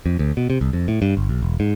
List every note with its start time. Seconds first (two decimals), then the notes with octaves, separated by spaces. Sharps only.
0.06 F2
0.19 D2
0.37 B2
0.50 C3
0.61 C2
0.73 F2
0.88 A2
1.02 G2
1.17 G1
1.29 B1
1.43 E1
1.60 G#2